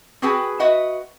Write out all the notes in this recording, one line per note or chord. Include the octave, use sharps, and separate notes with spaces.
C4 F#4 G#4 B4 G5 G#5
F#4 B4 D#5 E5 F#5